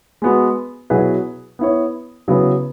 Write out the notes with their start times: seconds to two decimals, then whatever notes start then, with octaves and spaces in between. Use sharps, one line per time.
0.22 G#3 B3 F#4
0.90 B2 F#3 E4 G#4 B4
1.59 B3 E4 C#5
2.28 C#3 F#3 B3 E4 B4